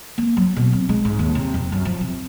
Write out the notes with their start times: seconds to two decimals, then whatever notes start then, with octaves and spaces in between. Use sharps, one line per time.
0.18 A#3
0.37 F#3
0.56 B2
0.73 C4
0.89 G#3
1.05 G#2
1.19 D#2
1.35 C3
1.54 F2
1.72 F#2
1.85 F3
2.01 C3